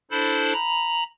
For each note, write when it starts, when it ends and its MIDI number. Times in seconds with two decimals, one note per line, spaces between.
0.11 0.53 62
0.11 0.53 64
0.11 0.53 69
0.11 0.53 72
0.11 0.53 83
0.53 1.04 82
0.53 1.04 83